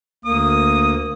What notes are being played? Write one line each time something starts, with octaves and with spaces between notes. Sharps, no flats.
D2 A#3 D#6